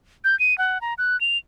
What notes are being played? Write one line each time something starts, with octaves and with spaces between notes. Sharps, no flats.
G6
D#7
F#5
A#5
F#6
F7